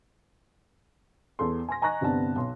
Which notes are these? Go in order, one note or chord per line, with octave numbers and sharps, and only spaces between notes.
E2 A4 C6
G#5 C6 A#6
D#5 G#5 A#5 C#6 F#6 A#6
G1 C3 B3 C4 D4 A5
B1 C6